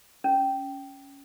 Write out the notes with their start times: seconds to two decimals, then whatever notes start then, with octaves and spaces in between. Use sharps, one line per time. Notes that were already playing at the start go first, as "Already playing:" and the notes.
0.24 C#4